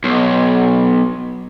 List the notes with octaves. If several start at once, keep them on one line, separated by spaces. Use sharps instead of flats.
B1